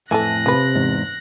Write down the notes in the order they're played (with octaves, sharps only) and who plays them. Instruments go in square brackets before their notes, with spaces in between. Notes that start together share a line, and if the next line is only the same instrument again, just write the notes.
[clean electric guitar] F2 A2 G#5 [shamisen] E3 A4 [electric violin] F#6 A#6
[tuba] C3 [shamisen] F3 B4
[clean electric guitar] E2 G#2